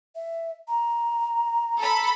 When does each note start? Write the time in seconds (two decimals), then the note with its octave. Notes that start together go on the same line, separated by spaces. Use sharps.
0.15 E5
0.68 A#5
1.79 A4 B5